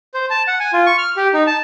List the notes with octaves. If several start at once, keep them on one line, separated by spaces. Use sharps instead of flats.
C5
A5
F#5
G#5
F4
C#6
F6
G4
D#4
A5